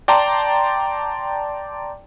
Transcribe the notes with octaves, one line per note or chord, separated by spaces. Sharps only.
D5 G5 A5 A#5 C6